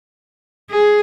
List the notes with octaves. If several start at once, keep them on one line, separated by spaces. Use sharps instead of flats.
G#4